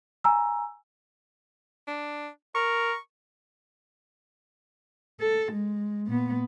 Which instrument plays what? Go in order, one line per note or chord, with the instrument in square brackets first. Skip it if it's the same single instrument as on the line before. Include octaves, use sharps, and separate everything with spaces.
[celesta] G#5 A#5 E6
[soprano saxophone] D4
[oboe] A#4 [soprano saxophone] C#6
[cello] A4
G#3
A#2 B3